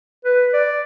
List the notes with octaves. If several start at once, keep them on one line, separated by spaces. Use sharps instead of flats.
B4
D5